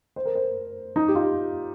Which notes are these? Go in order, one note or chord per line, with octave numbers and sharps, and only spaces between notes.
C5
A#4
C5
D#4
G4
F4